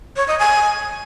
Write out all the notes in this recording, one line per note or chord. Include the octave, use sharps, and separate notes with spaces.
C#5
D#5
G#5